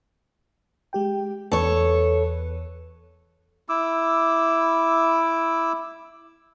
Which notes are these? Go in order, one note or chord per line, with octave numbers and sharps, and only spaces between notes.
G#3 G4 G5
E2 A4 B4 C#5
E4 D6 E6